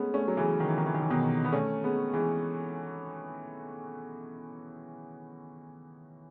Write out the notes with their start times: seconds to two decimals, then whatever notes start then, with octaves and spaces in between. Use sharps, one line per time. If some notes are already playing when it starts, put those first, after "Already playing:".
Already playing: G#3 A3 B3 C#4
0.14 A3 C#4
0.28 F#3
0.37 C#3 E3
0.60 D#3
0.69 E3
0.78 D#3
0.86 E3
0.94 D#3
1.02 E3
1.10 B2 D#3
1.45 B3
1.52 A3 C#4
1.83 G#3 B3
2.14 E3 G#3